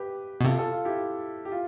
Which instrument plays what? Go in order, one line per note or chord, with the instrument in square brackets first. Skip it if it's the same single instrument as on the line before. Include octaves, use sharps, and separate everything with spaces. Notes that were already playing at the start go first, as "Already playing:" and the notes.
Already playing: [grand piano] G4 B4
[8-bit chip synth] B2
[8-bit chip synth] C3 [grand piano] F4 A4
[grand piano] F4 A4
F4
E4 G4
G4
F4